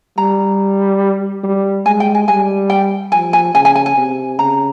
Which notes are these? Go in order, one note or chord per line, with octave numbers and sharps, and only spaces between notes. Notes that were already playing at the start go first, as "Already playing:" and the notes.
G3 A#5
G3
G#3 G#5
G5
G#5
G3 G#5
G5
F3 G#5
G#5
C#3 G#5
G#5
G#5
G#5
C3
C#3 A#5